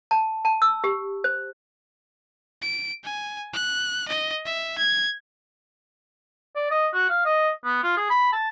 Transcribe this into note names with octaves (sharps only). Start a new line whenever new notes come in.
A5
A5
E6
G4
C5
D7
G#5
F#6
D#5
E5
G#6
D5
D#5
F#4
F5
D#5
B3
F4
G#4
B5
A5